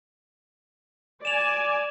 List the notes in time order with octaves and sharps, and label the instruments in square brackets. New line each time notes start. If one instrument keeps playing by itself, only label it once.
[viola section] D5 G#5 [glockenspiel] E7 F7